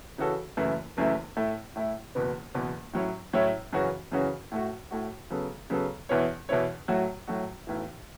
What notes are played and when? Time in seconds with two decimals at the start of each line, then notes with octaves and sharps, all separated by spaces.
0.18 C#3 E3 C#4 F#4 A4
0.57 F#1 F#2 E3 A3 E4
0.97 F#1 F#2 E3 A3 E4
1.36 A2 A3 E4
1.76 A2 A3 E4
2.15 F#1 E2 B2 B3
2.54 F#1 E2 B2 B3
2.93 A2 F#3 C#4 E4 C#5
3.33 A2 F#3 C#4 E4 C#5
3.73 F#2 C#3 E3 C#4 F#4
4.12 F#2 C#3 E3 C#4 F#4
4.51 A2 A3 F#4
4.91 A2 A3 F#4
5.30 C#3 F#3 B3 A4
5.70 C#3 F#3 B3 A4
6.09 E2 B2 B3 E4 C#5
6.49 E2 B2 B3 E4 C#5
6.88 A2 F#3 A3 F#4
7.27 A2 F#3 A3 F#4
7.67 B1 A2 E3